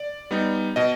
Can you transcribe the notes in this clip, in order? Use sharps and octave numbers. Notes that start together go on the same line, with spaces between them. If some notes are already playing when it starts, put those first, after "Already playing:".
Already playing: D5
G3 B3 D#4
B2 D#5